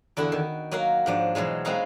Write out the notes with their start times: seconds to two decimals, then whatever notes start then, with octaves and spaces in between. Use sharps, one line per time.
0.17 E2 D3 E4 F#4
0.32 D#3
0.71 F#3 A#3 F#4 A#4 F5
1.06 G#2 F3 D4
1.35 B2 E3 F#3 G#3
1.65 G#3 B3 C4 D#4 F#4 F5